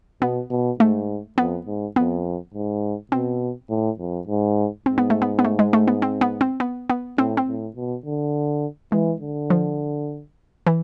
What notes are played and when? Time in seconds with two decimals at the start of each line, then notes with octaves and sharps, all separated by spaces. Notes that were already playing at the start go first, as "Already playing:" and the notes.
0.22 B2 B3
0.51 B2
0.80 G#2 A3
1.38 F2 B3
1.67 G#2
1.96 F2 B3
2.55 G#2
3.12 B2 C4
3.70 A2
3.99 F2
4.28 G#2
4.86 G#2 C4
4.98 B3
5.10 A3
5.22 B3
5.39 B3
5.44 A3
5.59 G#3
5.73 A3
5.88 B3
6.02 C4
6.21 B3
6.41 C4
6.60 B3
6.90 B3
7.18 A2 C4
7.37 C4
7.48 A2
7.76 B2
8.05 D3
8.92 E3 G#3
9.21 D3
9.50 F3
10.67 E3